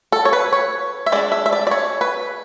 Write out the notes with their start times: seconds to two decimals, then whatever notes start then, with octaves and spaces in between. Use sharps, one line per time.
0.12 A4
0.25 C#5
0.33 B4
0.53 C#5
1.06 E5
1.12 G#3 D4 D5
1.32 E5
1.46 E5
1.53 D5
1.67 D5
1.71 C#5
2.01 B4